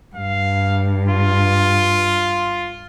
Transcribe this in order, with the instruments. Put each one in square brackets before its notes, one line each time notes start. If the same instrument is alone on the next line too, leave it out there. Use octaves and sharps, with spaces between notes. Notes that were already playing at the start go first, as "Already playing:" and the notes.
[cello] G2 [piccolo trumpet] F5
[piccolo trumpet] F4